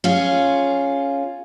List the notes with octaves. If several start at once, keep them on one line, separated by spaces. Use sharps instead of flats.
C#4 F4 G#4